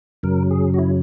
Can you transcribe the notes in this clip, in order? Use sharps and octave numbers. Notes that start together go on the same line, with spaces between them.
F#2 C#3 F#3 A#4
G#4
F#4
E4